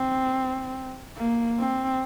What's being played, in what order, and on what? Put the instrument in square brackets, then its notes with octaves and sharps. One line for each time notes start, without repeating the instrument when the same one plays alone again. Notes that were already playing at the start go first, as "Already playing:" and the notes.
Already playing: [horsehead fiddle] C4
A#3
C4